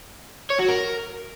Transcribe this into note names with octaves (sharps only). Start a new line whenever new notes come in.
C#5
F#4
A#4